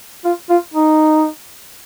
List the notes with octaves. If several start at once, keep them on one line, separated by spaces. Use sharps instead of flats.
F4
F4
D#4